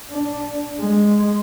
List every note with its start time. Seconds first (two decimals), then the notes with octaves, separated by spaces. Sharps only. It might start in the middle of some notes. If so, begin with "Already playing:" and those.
0.12 D4
0.80 G#3